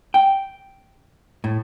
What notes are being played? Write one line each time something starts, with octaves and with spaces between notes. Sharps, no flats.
G5
A2